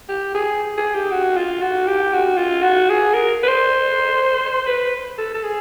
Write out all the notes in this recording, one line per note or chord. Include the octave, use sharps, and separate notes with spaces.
G4
G#4
G#4
G4
F#4
F4
F#4
G4
F#4
F4
F#4
G#4
A#4
B4
C5
B4
A4
A4
G#4